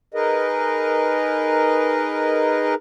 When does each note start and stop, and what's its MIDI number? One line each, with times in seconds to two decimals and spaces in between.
0.14 2.75 63
0.14 2.75 68
0.14 2.75 70
0.14 2.75 71
0.14 2.75 75